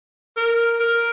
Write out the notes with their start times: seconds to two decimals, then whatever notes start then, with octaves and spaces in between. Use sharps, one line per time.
0.37 A#4
0.80 A#4